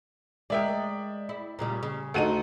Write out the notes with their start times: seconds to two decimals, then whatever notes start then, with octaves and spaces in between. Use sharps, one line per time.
0.50 G#3 A#4 D5 E5 G5
1.29 E4
1.59 A#2 C#3 G3
1.83 C#3
2.14 D2 D#4 F#4 A4 D#7